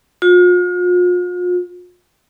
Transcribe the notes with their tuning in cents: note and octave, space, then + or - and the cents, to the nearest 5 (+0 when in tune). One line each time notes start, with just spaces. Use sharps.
F4 +40